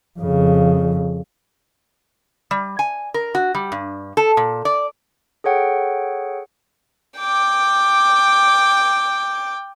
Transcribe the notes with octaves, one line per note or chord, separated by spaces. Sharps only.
F2 C#3
G3
G#5
A#4
F#4
G3
G2
A4
A#2
D5
G#4 A4 C#5 F#5 G5
G5 D6